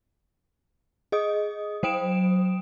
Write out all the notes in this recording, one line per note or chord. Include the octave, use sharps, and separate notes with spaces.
G#4 D#5 D#6
F#3 C5 G5 D#6 D7 E7